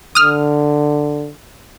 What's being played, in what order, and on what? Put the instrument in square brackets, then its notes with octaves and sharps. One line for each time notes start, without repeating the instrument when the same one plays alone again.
[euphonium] D3 [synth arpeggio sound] D#6 F6